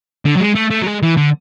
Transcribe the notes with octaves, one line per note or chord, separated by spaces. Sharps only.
D3
F#3
G#3
A3
A3
F#3
G#3
E3
D3